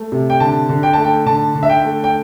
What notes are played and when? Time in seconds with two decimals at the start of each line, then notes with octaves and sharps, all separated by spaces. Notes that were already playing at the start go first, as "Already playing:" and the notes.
Already playing: A3
0.12 C3
0.30 G5
0.40 D3 A5
0.69 D3
0.83 G5
0.93 A3 A5
1.05 G5
1.26 D3 A5
1.55 D3
1.63 E5
1.69 G5
1.84 A3
2.04 G5